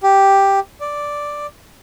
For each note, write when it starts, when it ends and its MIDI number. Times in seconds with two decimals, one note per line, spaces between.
0.03 0.60 67
0.80 1.46 74